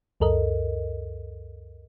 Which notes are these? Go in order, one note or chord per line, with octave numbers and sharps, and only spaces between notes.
C#2 F#2 A4 A#4 D#5